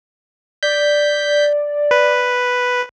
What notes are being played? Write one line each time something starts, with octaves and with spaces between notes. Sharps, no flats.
D5 G6 B6
B4